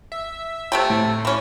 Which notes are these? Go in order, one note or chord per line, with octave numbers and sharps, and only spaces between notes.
E5
C3 A3 G5
A2
E3 C#4